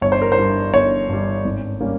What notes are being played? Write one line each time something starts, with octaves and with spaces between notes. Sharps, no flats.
G1 C#5
C5
A#4
C5
G2 G3
G1 C#5
G2 G3
G#1
G3 A#3 C#4